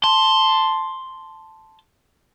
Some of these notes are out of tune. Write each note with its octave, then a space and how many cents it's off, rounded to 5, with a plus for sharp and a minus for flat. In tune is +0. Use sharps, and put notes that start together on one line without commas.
A5 +0 C6 +0